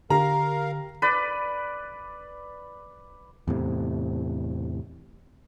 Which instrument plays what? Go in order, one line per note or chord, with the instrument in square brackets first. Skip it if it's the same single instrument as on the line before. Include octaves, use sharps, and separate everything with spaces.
[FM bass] D3 [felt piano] G4 [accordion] A#4 F5 [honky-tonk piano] A#5
[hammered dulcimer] B4 D5
[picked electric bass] E2 A2 C3